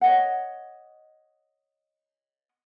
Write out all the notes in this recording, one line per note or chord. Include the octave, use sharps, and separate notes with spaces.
C#5 D#5 F#5